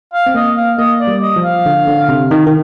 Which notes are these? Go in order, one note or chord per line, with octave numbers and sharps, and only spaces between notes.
F5
C4
A#3 D#5
F5
A#3 D#5
D5
G3
D#5
F3
F5
D3
D3
C3
D#3
D#3